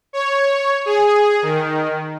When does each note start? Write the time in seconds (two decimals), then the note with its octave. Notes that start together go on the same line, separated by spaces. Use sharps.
0.13 C#5
0.86 G#4
1.42 D#3